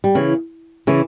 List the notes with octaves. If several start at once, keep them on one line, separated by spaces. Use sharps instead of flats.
G3
C#3 E3
C#3 E3